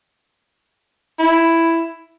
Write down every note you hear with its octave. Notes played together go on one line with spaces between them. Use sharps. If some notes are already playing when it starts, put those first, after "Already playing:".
E4